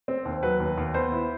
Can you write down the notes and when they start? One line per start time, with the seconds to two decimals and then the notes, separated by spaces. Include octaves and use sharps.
0.08 C4
0.25 D#2
0.43 F#3 B4
0.60 D#2
0.78 D#2
0.94 B3 C5
1.12 E4